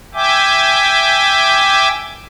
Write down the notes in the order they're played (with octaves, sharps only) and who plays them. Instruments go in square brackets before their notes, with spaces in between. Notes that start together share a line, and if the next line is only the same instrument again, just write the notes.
[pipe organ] E5 G5 G#5 D6